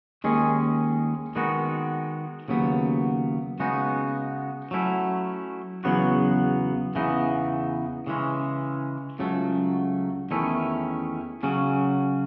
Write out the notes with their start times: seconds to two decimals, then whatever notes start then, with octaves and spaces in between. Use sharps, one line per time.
0.24 D#2 D#3 G#3 C#4 G#4
1.36 D#3 G#3 B3 D#4 F#4
2.48 D#2 C#3 F#3 B3
3.60 C#3 G#3 B3 D#4 F#4
4.71 F#3 A3 C#4 E4
5.84 E2 C#3 F#3 B3 F#4
6.95 E2 C#3 E3 B3 D#4
8.07 C#3 E3 G#3 C#4
9.19 C#2 C#3 F#3 A3
10.31 E2 D#3 A3 C#4 E4
11.43 C#3 F#3 C#4